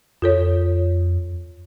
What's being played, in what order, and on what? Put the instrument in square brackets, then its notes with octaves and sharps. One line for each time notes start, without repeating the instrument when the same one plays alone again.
[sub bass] F2 [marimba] F4 A4 C#5